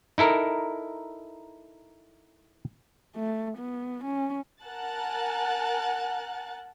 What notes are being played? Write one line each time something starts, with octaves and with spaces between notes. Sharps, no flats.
D#4 E4 A4 A#4
A3
B3
C#4
A#4 F#5 G#5 A5 F#6 A6